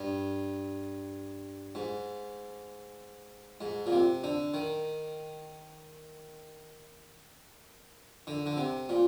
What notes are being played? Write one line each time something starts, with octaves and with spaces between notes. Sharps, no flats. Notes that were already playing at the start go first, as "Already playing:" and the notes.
Already playing: G2
G#2
G#2
A#2
C3
D3
D#3
D3
D3
C3
A#2